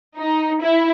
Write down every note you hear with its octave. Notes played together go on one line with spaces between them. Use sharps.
D#4
E4